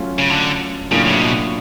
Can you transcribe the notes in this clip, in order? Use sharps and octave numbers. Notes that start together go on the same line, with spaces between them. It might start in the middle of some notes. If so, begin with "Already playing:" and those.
Already playing: F#3 A3 C#4 F4
C#3
D3
A2 C#3 F#3 A#3 D4 F4
C#3
C3
B2